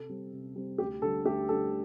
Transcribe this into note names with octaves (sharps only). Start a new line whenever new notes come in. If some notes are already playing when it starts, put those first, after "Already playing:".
Already playing: C3 A4
G3 C4
C3
G3 C4
D2 G4
D3 G3 D4 A4
D2 G4
D3 G3 D4 A4